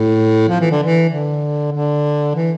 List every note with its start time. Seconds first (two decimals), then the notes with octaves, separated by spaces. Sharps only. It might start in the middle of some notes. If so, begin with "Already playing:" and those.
Already playing: A2
0.48 F3
0.60 E3
0.71 D3
0.83 E3
1.10 D3
1.72 D3
2.35 E3